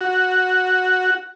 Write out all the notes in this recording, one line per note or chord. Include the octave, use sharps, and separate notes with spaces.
F#4